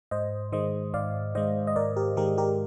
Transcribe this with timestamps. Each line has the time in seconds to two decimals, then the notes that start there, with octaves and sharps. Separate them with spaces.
0.11 G#2 C5 D#5
0.52 D#3 G#3 C5 D#5
0.94 G#2 D5 F5
1.35 D#3 G#3 C5 D#5
1.67 D#5
1.76 G#2 A#4 D5
1.96 G4 A#4
2.17 D#3 G#3 G4 A#4
2.38 G4 A#4